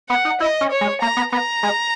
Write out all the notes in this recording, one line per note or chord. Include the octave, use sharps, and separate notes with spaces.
B3 F#5
D#4
E4 D#5
C#4
C#5
G#3
A#3 A#5
B3
B3 A#5
G#3